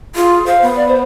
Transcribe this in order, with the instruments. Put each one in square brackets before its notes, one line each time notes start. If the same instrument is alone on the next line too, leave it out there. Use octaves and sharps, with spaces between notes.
[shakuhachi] F4 [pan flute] G#4
[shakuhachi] C5 [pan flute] F5
[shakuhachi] B3
[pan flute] D5
C5